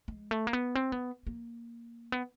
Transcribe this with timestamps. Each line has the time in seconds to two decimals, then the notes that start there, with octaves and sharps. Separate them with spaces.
0.08 G#3
0.31 A3
0.47 A#3
0.53 B3
0.75 C4
0.92 B3
1.27 A#3
2.12 B3